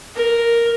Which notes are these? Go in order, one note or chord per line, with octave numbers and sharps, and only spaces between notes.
A#4